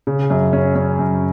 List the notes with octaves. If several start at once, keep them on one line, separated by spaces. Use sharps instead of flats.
C#3
F#2
C#4
C#4
F#2